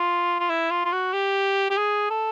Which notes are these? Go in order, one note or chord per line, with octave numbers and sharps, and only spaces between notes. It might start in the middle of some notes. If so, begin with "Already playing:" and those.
Already playing: F4
F4
E4
F4
F4
F#4
G4
G4
G#4
A4